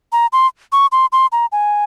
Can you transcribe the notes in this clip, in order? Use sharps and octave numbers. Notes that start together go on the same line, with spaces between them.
A#5
C6
C#6
C6
C6
A#5
G#5